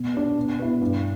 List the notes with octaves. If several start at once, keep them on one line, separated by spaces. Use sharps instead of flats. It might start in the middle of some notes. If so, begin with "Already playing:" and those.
Already playing: B2
B3 D4
B2
B3 E4
G2